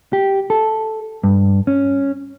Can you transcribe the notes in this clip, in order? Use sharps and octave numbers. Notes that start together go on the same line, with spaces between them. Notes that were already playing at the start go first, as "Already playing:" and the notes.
G4
A4
G2
C#4